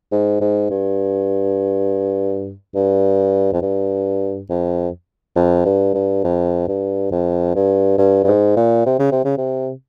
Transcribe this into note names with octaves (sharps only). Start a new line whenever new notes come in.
G#2
G#2
G2
G2
F2
G2
F2
F2
G2
G2
F2
G2
F2
G2
G2
G2
G#2
A#2
C3
C#3
C3
C#3
C3